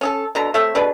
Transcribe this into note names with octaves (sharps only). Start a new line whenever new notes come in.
C#4 G#4 A4
B2 D3 A#5
A3 C4 C#5 E5
B2 D4 G#4 B4